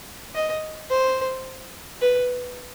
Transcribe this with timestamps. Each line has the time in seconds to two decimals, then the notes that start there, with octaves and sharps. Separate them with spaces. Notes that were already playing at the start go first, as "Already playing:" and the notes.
0.35 D#5
0.90 C5
2.02 B4